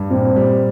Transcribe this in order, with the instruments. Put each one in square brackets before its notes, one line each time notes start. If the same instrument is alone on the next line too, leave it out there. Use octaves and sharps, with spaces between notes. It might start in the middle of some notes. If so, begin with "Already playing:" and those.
Already playing: [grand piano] G2
[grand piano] A#2 [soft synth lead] C4
[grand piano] G3